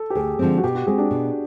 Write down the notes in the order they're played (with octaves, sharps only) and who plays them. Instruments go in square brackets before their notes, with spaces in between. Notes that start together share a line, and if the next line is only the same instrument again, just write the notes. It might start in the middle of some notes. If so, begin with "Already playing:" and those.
Already playing: [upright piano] A4
G4
[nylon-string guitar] D2 [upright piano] G#4
[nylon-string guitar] D3 F3 G#3 C4
[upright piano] F#4
[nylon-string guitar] B2 [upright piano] G4
[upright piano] F#4
[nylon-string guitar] G#3 C4 [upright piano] G#4
[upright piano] D4
[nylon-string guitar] B2